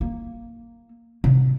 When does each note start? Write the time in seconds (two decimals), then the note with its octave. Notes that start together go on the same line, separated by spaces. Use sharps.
0.01 A#3
1.24 C3